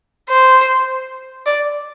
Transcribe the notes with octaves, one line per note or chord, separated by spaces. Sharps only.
C5
D5